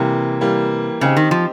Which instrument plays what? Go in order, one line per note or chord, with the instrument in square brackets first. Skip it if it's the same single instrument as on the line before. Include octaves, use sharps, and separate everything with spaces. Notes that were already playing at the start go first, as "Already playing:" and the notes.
Already playing: [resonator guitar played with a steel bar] C3 [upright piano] E3 G3 A#3
[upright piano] E3 G3 A#3
[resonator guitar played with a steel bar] C#3 [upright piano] C4 D#4 G4
[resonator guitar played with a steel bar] D#3
F3